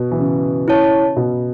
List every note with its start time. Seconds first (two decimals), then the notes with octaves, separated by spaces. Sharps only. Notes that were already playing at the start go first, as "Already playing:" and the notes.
Already playing: B2
0.11 E3
0.20 C#3
0.68 E4 C#5 A5
1.17 B2